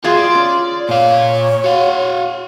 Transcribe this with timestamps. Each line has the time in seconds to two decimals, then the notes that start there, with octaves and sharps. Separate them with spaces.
0.04 F4 G4 G#4 F5 C6
0.18 D5
0.35 C#4
0.89 A#2 C#5 F5
1.64 F#4 F5